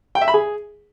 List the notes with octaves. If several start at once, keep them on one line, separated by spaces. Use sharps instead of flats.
G5
E5
B5
G#4